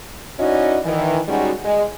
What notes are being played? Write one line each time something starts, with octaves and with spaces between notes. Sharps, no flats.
C#4 D#4 E4 F#4 D5 D#5
D#3 E3
G3 G#3 C#4 D#4 F#4
G#3